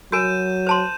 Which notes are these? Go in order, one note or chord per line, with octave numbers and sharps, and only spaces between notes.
F#3 F#4 A#4 G#5 G6 D#7 E7
C5 A5 C6